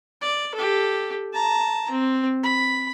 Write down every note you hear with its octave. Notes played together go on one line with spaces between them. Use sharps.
D5
G4 A4
A5 A#5
C4
B5